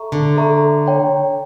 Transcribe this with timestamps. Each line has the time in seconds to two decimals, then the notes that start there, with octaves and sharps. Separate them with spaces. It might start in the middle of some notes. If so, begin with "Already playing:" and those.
Already playing: A4 E5 A#5 C#6
0.12 D3
0.37 A4 E5 A#5 C#6
0.86 C#5 G5 A#5